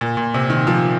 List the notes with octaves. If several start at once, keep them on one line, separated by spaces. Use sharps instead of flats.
A#2
A#2
C3
D#3
F3